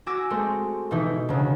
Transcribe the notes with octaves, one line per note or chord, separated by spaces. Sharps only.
F#4 G#5 D6 E6 A#6
G#3 A3 C4
B2 E3 D#4 E4
D2 C#3